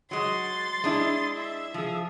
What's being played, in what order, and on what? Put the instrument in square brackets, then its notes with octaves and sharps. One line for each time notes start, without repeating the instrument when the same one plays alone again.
[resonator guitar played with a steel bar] F#3 G#3 [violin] C6 A6
[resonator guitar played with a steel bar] G#3 D4 E4
[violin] E5
[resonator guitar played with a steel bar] F3 G#4